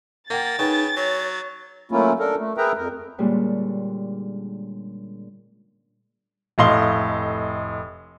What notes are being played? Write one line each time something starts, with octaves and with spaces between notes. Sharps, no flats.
A#3 A#4 F#5 G5 A6
C#3 D#4 B4 G5 G#5
F#3 C#5
F#3 A3 A#3 C#4 E4 F4
D4 A4 A#4
A3
G#4 A#4 B4 E5 G5 A#5
F2 A#4
A#2 D3 G3 G#3 C#4
F1 A2 D#5 F5 C6 G7